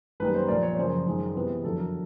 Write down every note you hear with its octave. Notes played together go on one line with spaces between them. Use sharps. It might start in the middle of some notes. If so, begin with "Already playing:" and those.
F#2 D#3 G3 A#3 B4
C5
A#2 F3 A#3 D5
C#5
F#2 C#3 F3 C5
F#2 D#3 G#3
C3 E3 G#3 B3 B4
F2 D3 F#3 A4
A#4